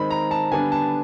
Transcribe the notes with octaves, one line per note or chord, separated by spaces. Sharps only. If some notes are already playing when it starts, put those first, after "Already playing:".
Already playing: D#3 G#3 C4 B5
A#5
A5
D3 G3 B3 D4 G#5
A5